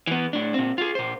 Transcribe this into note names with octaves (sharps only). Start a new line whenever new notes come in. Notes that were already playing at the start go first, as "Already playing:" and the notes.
E3 B3
A2 D4
A#2 C4
F4 G#4
A#2 C5